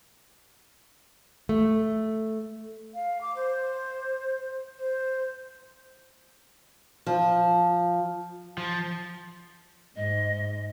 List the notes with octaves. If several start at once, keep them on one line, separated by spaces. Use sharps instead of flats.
A3
F5
D6
C5
C5
F3
F3
G#2 D#5